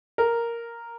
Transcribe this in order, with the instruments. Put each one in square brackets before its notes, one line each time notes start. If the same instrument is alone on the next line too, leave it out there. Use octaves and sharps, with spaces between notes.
[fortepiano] A#4